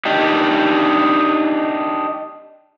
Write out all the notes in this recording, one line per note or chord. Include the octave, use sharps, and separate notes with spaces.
D4 D#4 G4